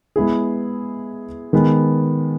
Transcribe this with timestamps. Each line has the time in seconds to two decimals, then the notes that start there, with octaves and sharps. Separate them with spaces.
0.16 G#3 B3 E4 G#4
1.53 D#3 G#3 B3